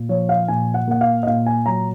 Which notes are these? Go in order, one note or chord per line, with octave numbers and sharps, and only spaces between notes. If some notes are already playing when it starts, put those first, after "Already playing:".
Already playing: A#2
F3 C#5
F5
A#2 G#5
F#5
A#3 F#5
F5
D#5
A#2 F5
G#5
F#3 A#5